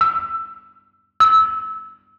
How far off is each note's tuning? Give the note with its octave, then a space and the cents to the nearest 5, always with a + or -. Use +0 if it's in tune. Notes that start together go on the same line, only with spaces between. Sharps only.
E6 +15
E6 -20